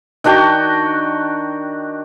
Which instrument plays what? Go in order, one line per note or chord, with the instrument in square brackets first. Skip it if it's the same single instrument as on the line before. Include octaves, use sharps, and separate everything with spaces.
[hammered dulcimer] D#3 D4 F#4 G5